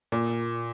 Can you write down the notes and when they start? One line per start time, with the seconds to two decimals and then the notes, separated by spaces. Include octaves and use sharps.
0.12 A#2